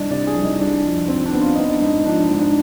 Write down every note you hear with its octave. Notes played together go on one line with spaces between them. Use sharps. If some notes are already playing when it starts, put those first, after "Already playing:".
Already playing: C2 D#3 D4 D5 D#5
C3 D4 D5
G#4 G#5
C2
D#4 D#5
G3 D4 D5
F2
D#3 C4 C5
D4
B3
F4
B3 D#4
D4
G#2 D#4
F3 D4
D#4
G#2
D4